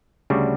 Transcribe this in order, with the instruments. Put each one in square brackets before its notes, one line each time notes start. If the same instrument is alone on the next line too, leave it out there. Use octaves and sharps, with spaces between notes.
[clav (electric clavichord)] D2 C#3 G3 D4 F#4